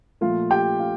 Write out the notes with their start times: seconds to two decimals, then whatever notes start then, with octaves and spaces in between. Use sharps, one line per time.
0.21 A#2 F3 A3 F4 F5
0.50 G4 G5
0.79 F4 F5